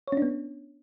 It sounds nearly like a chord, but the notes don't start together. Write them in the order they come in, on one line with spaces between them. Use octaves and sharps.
C#5 C#4 D4 B3